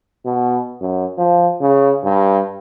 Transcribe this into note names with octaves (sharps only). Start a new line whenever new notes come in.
B2
F#2
F3
C#3
G2